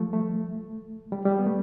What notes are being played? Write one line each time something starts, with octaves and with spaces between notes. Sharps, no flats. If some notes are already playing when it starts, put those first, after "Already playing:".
Already playing: F3 G3 A3
A3
G3
G3
B3
A3